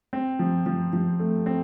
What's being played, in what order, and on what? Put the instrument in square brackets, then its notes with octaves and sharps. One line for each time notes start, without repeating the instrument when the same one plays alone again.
[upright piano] C4
F3
F3
F3
A3
C4